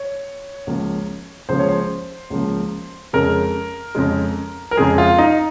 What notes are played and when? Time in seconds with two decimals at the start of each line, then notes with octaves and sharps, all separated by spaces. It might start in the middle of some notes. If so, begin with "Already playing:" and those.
Already playing: C#5
0.67 C#2 C#3 F3 A#3
1.49 C#2 C#3 F3 A#3 C5
1.59 C#5
1.69 C5
2.30 C#2 C#3 F3 A#3
3.13 F2 C#3 G#3 A#4
3.95 F2 C#3 G#3
4.71 A#4
4.77 F2 C#3 G#3 G#4
4.98 F4
5.18 D#4